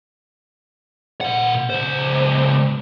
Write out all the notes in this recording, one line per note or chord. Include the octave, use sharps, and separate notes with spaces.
A#2 F#5
C#2 C5